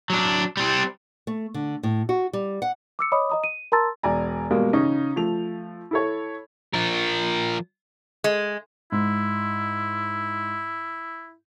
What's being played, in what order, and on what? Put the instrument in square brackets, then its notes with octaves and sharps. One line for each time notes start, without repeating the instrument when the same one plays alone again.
[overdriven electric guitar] F#3 D4
G3 C4
[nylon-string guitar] A3
D3
A2
F#4
G3
F#5
[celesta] D6 E6 C#7
C#5 D#5 B5 D6 D#6
D#5 A#5 D#6
D#7
A#4 A5 A#5 C6 E6 A6
[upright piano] E1 D5 G#5 A#5
B2 G3 G#3 A#3
C#3 C#4 D#4
F3 A3 F7
E4 A4 C#5
[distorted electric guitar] F3 A#4
[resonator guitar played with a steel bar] G#3
[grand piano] G#2 [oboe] E4